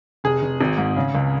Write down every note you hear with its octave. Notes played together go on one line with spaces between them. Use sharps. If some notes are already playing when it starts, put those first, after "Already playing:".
F1 G#4
F1
G#1
G#2
C#3
C#2